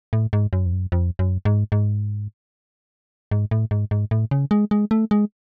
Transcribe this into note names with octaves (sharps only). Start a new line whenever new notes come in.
A2
G#2
F#2
F2
F#2
F2
F#2
G#2
G#2
G#2
A2
G#2
G#2
A2
C#3
G#3
G#3
A3
G#3